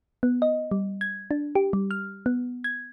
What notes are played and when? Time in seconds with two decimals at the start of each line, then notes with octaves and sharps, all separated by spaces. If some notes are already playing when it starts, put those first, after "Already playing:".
0.23 B3
0.42 D#5
0.71 G3
1.01 G#6
1.31 D4
1.55 G4
1.73 G3
1.91 F6
2.26 B3
2.64 G#6